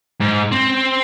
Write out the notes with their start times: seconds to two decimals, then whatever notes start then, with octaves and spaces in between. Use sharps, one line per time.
0.20 G#2
0.52 C4